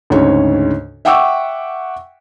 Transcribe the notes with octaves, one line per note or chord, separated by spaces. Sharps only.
D2 G#2 C#3 C#5
E5 F#5 G5 C#6 D6 E6